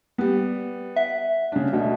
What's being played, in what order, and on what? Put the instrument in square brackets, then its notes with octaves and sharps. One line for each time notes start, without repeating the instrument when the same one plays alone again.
[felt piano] G3 B3
[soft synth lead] E5 [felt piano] F#5
[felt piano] C#3 D4
D2 B2